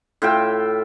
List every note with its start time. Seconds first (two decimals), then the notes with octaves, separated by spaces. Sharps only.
0.22 A2 F4 E5 G5